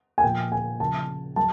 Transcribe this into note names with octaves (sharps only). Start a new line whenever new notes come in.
G#5
A#2 F3 G5
G#5
C#3 F3 A5
F#3 A5